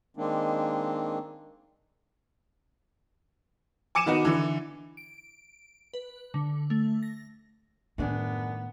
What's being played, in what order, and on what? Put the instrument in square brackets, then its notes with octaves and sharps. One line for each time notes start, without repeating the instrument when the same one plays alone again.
[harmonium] D#3 G#3 A#3 C4 D4 D#4
[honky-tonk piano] G#5 D6 C#7 D#7 E7
D#3 B3 D#4 F#4
D3 E3
[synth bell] D7
B4
D3
A3
A#6
[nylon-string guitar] F#2 D4 G#4 [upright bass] A2 D#3 [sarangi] B3